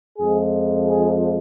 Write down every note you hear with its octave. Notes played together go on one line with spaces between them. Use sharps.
F2 F3 G#3 G#4
G#4